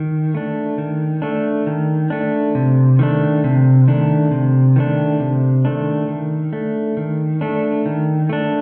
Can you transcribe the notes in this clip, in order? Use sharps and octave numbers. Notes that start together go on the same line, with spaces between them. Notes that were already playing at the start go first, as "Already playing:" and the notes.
Already playing: D#3
A3 D4
D#3
A3 D4
D#3
A3 D4
C3
D#3 A3 D4
C3
D#3 A3 D4
C3
D#3 A3 D4
C3
D#3 A3 D4
D#3
A3 D4
D#3
A3 D4
D#3
A3 D4